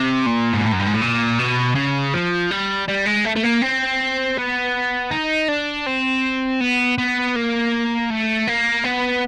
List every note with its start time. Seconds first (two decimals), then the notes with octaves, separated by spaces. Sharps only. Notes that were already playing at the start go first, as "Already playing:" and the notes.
Already playing: C3
0.26 A#2
0.53 G#2
0.65 A2
0.72 F#2
0.79 G2
0.86 G#2
0.94 A2
1.01 A#2
1.39 B2
1.75 C#3
2.13 F3
2.51 G3
2.88 G3
3.06 G#3
3.25 A3
3.36 A3
3.44 A#3
3.62 C4
4.38 B3
5.11 D#4
5.48 D4
5.86 C4
6.61 B3
6.98 B3
7.36 A#3
8.10 A3
8.48 A#3
8.84 B3